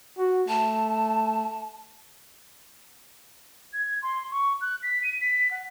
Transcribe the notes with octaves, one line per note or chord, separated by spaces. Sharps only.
F#4
A3 A5
G#6
C6
C#6
F#6
B6
D#7
B6
F#5